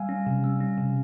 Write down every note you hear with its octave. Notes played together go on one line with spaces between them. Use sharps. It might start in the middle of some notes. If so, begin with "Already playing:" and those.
Already playing: G3 F5 G#5
C#4
C3
G3
C#4
C3